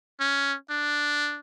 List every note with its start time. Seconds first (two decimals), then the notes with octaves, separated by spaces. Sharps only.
0.20 C#4
0.70 D4